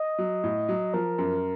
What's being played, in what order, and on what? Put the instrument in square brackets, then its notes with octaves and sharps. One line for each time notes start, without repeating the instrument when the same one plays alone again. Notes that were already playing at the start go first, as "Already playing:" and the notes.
Already playing: [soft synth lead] D#5
[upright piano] F#3
A2
F#3
[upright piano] F3 [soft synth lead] A#4
[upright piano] F#2